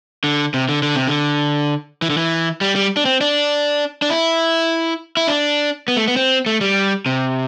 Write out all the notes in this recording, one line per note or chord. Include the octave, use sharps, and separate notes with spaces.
D3
C3
D3
D3
C3
D3
E3
D3
E3
G3
G3
D4
C4
D4
D4
E4
E4
D4
B3
A3
B3
C4
A3
G3
C3